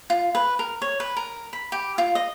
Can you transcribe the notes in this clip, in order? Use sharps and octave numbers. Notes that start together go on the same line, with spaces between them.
F4
B4
A#4
C#5
B4
A#4
B5
G4
F4
D#5